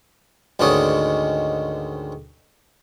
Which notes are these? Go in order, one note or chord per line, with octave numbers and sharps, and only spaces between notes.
D2 G#2 D#3 C#4 D5 D#5